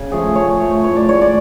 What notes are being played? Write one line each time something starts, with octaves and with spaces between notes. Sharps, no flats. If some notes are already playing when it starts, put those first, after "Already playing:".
Already playing: C#3
F3 A3 G#4
C#3 C#5
F3 A3
A2 C#5
D5
G#3 C#5
D5